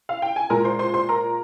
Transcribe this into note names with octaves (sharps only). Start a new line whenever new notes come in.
F5
G5
G#5
A#2 G#3 A#4 A#5
C5 C6
C5 C6
C5 C6
A#4 A#5